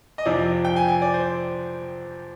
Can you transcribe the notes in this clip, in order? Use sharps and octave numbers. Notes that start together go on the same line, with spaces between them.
D#5
F2 C3 F3 D5
G5
G#5
G#5
D5
C5